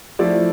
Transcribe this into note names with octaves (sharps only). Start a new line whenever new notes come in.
F3 A3 E4 D5